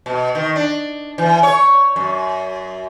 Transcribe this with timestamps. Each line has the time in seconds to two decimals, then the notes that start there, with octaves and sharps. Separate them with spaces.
0.06 B2
0.35 D#3
0.56 D4
1.18 E3
1.43 C#5
1.96 F#2